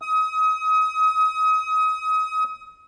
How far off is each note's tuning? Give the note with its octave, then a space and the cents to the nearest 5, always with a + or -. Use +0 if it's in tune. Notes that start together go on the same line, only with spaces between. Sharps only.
D#6 +30